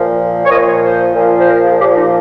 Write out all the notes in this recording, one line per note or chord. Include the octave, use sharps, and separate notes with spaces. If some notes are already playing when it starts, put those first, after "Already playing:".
Already playing: A#2 F3
C#5
A#2 F3 D#5
C#5
C5
A#2 F3
C5
A#4
G#4
A#2 F3 G4
D#4